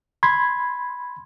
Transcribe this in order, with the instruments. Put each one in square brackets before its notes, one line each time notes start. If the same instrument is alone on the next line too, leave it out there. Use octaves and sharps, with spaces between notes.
[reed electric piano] B5 C6 G#6